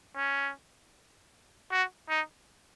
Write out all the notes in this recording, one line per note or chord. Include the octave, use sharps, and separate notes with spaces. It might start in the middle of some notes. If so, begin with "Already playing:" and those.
C#4
F#4
D#4